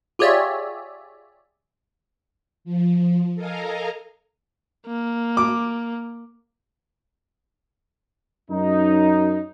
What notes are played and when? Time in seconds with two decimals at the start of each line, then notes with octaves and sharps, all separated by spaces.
0.19 F4 G4 G#4 C#5 D5 E5
2.64 F3
3.35 A4 A#4 D#5 F5 G#5 A#5
4.87 A#3
5.37 D6
8.51 F#2 D#4